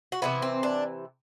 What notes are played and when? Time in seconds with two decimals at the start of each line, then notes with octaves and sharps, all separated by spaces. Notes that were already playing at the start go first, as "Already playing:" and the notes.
0.12 F#4
0.22 C3 E3 B3 E4
0.42 C4
0.63 D4